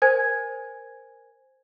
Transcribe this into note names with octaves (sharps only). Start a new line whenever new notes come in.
A#4 C5 G#5 G#6